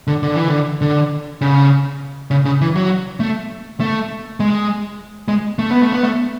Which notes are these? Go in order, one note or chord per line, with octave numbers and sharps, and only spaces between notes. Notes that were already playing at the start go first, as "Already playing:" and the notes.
D3
D3
E3
D3
D3
C#3
C#3
C#3
E3
F#3
A3
A3
G#3
G#3
A3
B3
A3
B3
A3